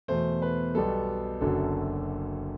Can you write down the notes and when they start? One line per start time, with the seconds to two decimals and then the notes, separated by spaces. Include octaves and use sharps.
0.08 E2 B2 A3 C5
0.42 B4
0.75 B1 B2 G3 B3 A4
1.41 F#1 F#2 D3 F#3 A4